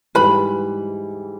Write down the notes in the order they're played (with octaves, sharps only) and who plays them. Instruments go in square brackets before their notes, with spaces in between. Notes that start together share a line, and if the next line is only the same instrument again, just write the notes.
[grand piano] G#2 E3 G3 [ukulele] B4 B5